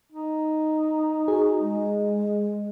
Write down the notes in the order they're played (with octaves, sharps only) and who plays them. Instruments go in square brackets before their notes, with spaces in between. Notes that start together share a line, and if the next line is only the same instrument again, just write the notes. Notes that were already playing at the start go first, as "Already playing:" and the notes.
[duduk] D#4
[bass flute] F#4 [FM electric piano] G#4
[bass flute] G#3